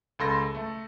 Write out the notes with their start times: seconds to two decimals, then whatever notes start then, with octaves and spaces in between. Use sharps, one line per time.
0.19 C#2 A4 B5 C6 E6 A#6
0.55 A3 A4